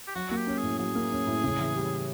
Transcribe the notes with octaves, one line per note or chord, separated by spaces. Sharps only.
G4
F#3 F#4
A#3 F#4
G4
C#4
A2 G#4
F#3 G#4
A#3
C#4
A2
C#3
E3
G3